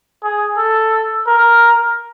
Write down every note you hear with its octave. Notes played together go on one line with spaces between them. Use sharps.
G#4
A4
A#4